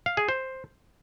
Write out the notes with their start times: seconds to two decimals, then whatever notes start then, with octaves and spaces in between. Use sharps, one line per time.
0.06 F5
0.17 G#4
0.29 C5